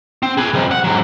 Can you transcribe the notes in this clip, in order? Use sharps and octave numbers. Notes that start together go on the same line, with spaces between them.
C4
G#4 B4
C2 F2
F#5
G#2 F#3